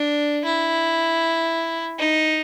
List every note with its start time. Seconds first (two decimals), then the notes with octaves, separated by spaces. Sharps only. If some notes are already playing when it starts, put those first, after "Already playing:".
Already playing: D4
0.44 E4
1.99 D#4